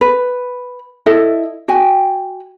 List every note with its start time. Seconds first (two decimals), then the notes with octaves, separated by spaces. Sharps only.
0.01 B4
1.06 E4 A4 D#5 E5
1.68 F#4 G5 G#5